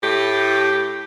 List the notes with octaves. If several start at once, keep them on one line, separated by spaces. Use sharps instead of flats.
A2 A3 G4